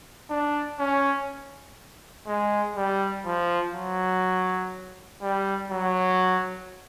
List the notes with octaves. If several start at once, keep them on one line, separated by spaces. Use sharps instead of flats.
D4
C#4
G#3
G3
F3
F#3
G3
F#3